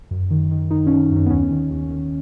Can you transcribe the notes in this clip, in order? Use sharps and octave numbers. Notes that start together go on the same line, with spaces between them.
F#2
D#3
D#3
D#3 D#4
D#3 C#4
F#2 C#4
B3
D#2 C#4
D#3
D#2
D#3